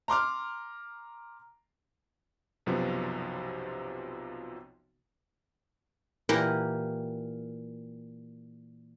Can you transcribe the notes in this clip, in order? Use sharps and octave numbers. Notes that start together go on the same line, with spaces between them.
A#5 C6 D6 F6
B1 F#2 C3 F3 B3
A#2 E3 G4 A#4 F#5